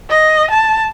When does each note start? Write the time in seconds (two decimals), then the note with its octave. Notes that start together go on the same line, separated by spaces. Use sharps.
0.10 D#5
0.51 A5